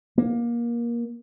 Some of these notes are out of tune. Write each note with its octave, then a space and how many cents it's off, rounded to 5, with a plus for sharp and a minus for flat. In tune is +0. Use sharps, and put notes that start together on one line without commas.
A#3 +20